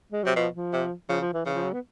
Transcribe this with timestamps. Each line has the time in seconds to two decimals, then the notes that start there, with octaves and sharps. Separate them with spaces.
0.12 G#3
0.23 C3 F#3
0.36 B2 F3
0.54 F3
0.73 C3
1.09 C#3 F3
1.21 F3
1.34 E3
1.45 C#3 E3
1.55 F3
1.64 F#3
1.73 B3